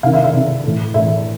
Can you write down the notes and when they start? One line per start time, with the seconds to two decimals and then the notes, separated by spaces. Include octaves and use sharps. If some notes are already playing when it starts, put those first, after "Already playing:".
0.03 C3 D#3 F5
0.13 E5
0.24 E5
0.33 C3 D#3
0.64 A2 E3
0.94 A2 E3 E5